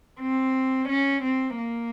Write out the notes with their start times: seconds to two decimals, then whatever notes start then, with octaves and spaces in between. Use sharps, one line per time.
0.20 C4
0.88 C#4
1.23 C4
1.57 A#3